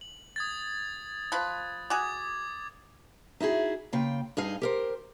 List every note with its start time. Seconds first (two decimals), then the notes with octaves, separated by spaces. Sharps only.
0.01 F#7
0.36 D#6 G#6 A6
1.32 F3 B4
1.90 F#4 G#4 D6 G#6
3.40 D#4 E4 F#4 G#4
3.93 C#3 A#3 F4 G5
4.37 G2 D#4 G#4 D#5 F5 G#5
4.62 G4 A#4 C5